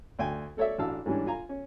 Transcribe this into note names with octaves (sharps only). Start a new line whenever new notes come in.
D2 G5 G#5
A3 A4 C#5 D5 E5
A1 D4 F#4 F5 A5 E6
G#2 E3 G3 C#4 D4
F4 G#5 A#5
C#4